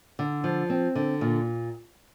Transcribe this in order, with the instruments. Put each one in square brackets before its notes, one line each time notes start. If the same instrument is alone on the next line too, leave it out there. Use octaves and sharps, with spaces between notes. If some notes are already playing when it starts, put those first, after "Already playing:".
[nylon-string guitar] D3
F3
C4
D3
A#2